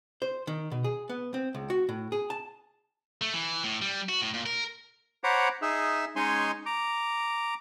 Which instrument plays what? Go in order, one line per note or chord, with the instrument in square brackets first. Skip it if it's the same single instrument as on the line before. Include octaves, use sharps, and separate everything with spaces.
[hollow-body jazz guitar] C5
D#3
B2
G#4
B3
C4
C#2
F#4
A2
G#4
A5
[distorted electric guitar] A3
E3
A2
G3
F#4
A2
A#2
A#4
[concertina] C5 C#5 F#5 A#5 B5 D6
D#4 G#4 E5
G#3 C#4 D#4 C#5 G#5 C6
A#5 D6